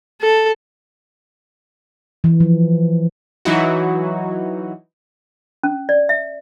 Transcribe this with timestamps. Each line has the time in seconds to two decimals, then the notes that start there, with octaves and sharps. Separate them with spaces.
0.21 A4
2.24 E3
2.40 F3
3.45 E3 F#3 D#4 E4 F#4
5.63 C#4
5.89 D5
6.09 E5